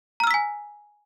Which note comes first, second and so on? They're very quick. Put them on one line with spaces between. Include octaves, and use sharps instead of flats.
A#5 F6 E6 B6 G#5